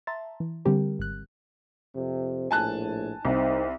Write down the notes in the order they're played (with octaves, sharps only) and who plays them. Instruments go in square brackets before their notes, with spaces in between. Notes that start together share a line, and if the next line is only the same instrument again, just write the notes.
[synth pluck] E5 A5 A#5 C6 A6
E3
D3 G3 C4 G4 A#4
G#1 F#6
[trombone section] F2 C3
[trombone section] A#1 A2 [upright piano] G#5 A5 F#6
[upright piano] C2 [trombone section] C4 D#4